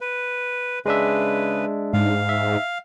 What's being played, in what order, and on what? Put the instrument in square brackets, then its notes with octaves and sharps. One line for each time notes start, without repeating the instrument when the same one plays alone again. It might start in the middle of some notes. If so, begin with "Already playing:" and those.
[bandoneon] B4
[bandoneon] C#3 B4 [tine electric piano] G#3 D4 E5
[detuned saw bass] G#2 [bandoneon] F5
[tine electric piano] E5